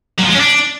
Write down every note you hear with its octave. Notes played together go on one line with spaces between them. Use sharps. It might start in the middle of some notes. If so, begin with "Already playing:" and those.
F#3
F3
G#3
C#4
D4